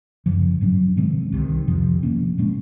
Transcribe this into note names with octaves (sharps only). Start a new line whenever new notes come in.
F#2 C#3 F3
G#2 F#3 C#4
C3 D#3 G#3 C4
C2 C3 D#3
F2 C3 F3
C3 F3 A#3 C#4
A#2 G#3 C#4